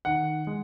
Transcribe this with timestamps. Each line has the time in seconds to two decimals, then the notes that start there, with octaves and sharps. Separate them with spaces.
0.05 D#3 F#5
0.47 G#3